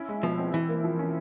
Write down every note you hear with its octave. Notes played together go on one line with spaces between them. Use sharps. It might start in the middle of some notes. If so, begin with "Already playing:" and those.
Already playing: C#4 E4
G#3
B2 F3
C4
E3 E4
A#3
F3
C#4